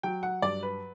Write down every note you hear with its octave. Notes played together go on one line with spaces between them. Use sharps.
F#3 G5
F#5
G2 D5
B4